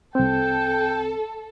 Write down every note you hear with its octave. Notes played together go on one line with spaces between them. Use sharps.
C2 C4 A4 G5